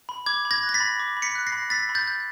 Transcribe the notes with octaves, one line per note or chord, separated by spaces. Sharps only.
B5
D6 G#6
B5
G#6 A#6
F#6
A#6
A6 B6
B5
D6
B5
B6 C#7
F#6
A#6 C7
B5
E6 A6 B6
B5
G6 A6
G6